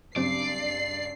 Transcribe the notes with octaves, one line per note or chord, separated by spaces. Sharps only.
G2 C#3 F#3 C4 D5 C7